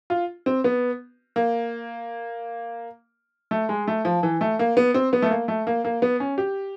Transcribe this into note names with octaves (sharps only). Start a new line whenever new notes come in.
F4
C4
B3
A#3
A3
G#3
A3
F3
E3
A3
A#3
B3
C4
B3
A3
A#3
A3
A#3
A#3
B3
C#4
G4